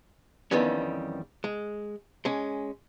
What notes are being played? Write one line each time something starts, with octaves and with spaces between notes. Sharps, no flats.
F2 D#3 E3 G3 B3 C#4
G#3
G#3 C#4